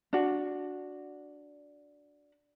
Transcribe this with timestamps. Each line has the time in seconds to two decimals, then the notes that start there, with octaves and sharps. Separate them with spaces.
0.13 D4 F#4